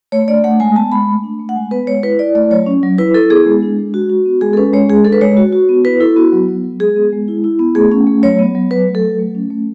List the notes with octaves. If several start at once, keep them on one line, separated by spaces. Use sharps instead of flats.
A3 C#5
D4 D5
A3 F#5
G#3 G#5
B3 A5
G#3 B5
A3
D4
A3
F#5
G#3 G#5
B3 B4
G#3 C#5
E4 B4
E4 D5
A3 D5
F#3 C#5
C#4
F#3
E4 B4
E4 A4
B3 G#4
G#3
D4
G#3
F#4
F#4
B3
G#3 G#4
A4
C#4 B4
G#3 C#5
G#3 G#4
D4 A4
B4
G#3 C#5
F#4
F#4
B3
E4 B4
E4 A4
B3 F#4
F#3
B3
F#3
G#3 G#4
B3
G#3
E4
E4
B3
A3 G#4
C#4
A3
F#3 C#5
B3
F#3
F#3 B4
A3
A4
F#3
A3
C#4
A3